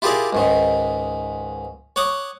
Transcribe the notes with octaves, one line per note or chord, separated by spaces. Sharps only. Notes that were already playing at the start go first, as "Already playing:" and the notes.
E4 F4 G4 G#4 A#4 D5
C#2 G#2 D#3
C#5 F#5 D6 D#6